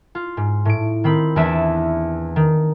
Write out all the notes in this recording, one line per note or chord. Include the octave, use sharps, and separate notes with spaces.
F4
G#2
A2 D7
D#3 C4 B5
E2 E3 D4 D5 E5 E7
D#3